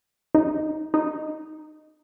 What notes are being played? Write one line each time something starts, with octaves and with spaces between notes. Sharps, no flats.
D#4
D#4